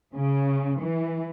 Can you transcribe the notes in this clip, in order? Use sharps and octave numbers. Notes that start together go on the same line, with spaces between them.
C#3
E3